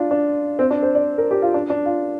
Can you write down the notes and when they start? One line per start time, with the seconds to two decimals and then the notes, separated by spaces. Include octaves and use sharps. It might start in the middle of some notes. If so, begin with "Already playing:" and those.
Already playing: D4 F4
0.11 D4
0.59 C4
0.71 D4
0.83 C5
0.95 D5
1.18 A#4
1.31 G4
1.42 F4
1.54 D4
1.70 D4
1.86 F4